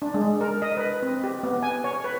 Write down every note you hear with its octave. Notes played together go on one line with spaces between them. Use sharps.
D4
G#3
A#4
D#5
B4
C4
G4
B3
G#5
C#5
B4